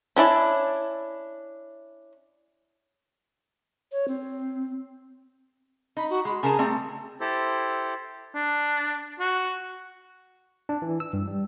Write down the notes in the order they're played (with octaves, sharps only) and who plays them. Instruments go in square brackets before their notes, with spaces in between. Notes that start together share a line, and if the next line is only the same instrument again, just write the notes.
[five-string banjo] C#4 D4 E4 D5
[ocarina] C#5
C4
[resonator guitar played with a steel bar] D#4 [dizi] B5
[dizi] F#4
[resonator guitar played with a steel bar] G#3 [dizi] B5
[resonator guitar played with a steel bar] C#3 A#4 A5 [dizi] G#4
[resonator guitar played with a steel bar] G3 A3 C4
[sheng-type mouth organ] E4 G4 A4 C5
[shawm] D4
F#4
[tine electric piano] D4
E3
E6
G2
G3